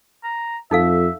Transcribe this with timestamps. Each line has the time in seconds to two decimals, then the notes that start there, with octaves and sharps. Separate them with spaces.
0.24 A#5
0.71 F2 D#4 A4 E5 F5